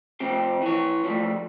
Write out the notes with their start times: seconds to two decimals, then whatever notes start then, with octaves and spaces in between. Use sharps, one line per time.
0.20 C3 F3 C4 G4
0.62 E3 C#5
1.04 F3 G3 A3